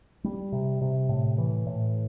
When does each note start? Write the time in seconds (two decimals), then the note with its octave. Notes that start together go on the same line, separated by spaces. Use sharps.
0.24 G3
0.52 C3
0.81 C3
1.09 A2
1.38 E3
1.66 A2